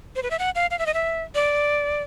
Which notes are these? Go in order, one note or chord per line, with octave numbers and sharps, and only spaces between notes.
C5
B4
E5
F#5
F5
F5
E5
D#5
E5
D5